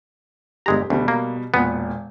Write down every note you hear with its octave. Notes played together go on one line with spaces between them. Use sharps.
G1 G#3 G4 A#5
D2 B2 G3
A#3
E1 A#2 B3